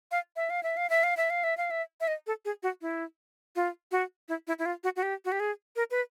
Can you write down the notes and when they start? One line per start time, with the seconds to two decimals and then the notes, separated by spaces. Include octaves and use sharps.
0.11 F5
0.36 E5
0.50 F5
0.63 E5
0.77 F5
0.90 E5
1.03 F5
1.17 E5
1.30 F5
1.44 E5
1.57 F5
1.71 E5
2.01 E5
2.08 D#5
2.27 A4
2.45 G#4
2.63 F#4
2.82 E4
3.56 F4
3.92 F#4
4.29 E4
4.47 E4
4.59 E4
4.66 F4
4.84 F#4
4.96 F#4
5.03 G4
5.25 F#4
5.32 G4
5.40 G#4
5.76 A#4
5.91 B4